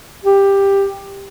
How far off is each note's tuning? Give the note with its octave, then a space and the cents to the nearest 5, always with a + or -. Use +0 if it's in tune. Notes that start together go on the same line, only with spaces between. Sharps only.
G4 +10